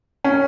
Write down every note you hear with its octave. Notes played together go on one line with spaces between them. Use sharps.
C#4